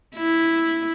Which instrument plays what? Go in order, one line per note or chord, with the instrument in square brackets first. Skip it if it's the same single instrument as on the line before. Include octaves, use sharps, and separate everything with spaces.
[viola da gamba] E4